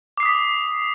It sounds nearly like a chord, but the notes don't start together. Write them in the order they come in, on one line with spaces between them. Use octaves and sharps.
D6 C7 D#6 B6